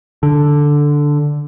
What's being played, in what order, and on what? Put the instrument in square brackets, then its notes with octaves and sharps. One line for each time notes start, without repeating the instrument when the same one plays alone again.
[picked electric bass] D3